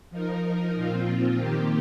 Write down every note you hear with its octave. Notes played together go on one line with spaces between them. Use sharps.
F3 D#4 A#4
A#2 F3 C4 F4
D#3 A#3 G4